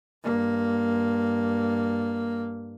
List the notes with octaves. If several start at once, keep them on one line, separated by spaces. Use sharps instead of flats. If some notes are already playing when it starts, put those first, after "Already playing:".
G2 A#3